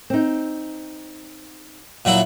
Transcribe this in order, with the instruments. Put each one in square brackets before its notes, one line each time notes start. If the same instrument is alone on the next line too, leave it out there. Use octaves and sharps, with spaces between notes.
[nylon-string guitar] C4 D#4
[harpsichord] A#2 F#3 E4